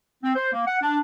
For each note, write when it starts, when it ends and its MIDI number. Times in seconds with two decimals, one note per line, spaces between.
0.24 0.32 60
0.35 0.50 72
0.53 0.66 58
0.67 0.77 78
0.81 0.99 62